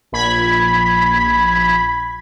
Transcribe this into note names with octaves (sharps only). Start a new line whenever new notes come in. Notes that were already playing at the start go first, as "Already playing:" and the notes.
A#1 B5 G#6 B6